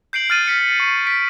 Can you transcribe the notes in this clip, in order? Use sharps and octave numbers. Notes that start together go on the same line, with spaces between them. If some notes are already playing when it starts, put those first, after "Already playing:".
G6 C7 D7 F#7
F6 A6 D#7
F6 B6 C#7
C#6
B6 D7